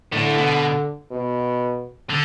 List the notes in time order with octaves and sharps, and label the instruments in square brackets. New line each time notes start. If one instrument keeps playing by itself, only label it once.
[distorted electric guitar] A2 [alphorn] D3
[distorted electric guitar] B2
[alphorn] B2
[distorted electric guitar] D3